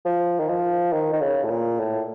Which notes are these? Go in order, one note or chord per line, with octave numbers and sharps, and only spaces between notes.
F3
D#3
F3
D#3
D#3
C#3
A2
A#2
A2